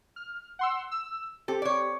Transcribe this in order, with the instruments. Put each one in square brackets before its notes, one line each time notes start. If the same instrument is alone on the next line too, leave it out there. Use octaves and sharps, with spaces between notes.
[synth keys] F6
F#5 C6 E6
E6
[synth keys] C4 G4 [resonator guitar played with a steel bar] A4
[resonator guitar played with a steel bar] C#5 D5